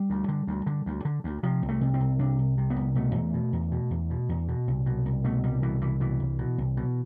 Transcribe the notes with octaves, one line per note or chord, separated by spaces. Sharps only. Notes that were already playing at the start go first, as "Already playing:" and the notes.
Already playing: G3
D2
D3
D2
D3
D2
D3
D2
C3 F3
C2
A3
C3
C4
C2
C3 D4
C2
C3
B3
C2
B2 A3
E2
B2
E2
B2
E2
B2
E2
B2
C2
B2
C2
B2 A3
C2 G3
B2 E3
C2 E3
B2 E3
C2
B2
C2
B2